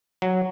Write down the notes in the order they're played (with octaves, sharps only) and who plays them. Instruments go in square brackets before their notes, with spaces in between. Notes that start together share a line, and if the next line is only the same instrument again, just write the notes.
[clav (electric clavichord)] F#3